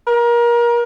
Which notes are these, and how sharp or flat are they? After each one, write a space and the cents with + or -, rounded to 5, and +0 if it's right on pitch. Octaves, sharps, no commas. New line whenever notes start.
A#4 +30